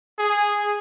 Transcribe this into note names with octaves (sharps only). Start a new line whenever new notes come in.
G#4